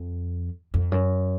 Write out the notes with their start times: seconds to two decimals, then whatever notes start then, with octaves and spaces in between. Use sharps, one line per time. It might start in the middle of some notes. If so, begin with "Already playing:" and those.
Already playing: F2
0.74 F2
0.92 F#2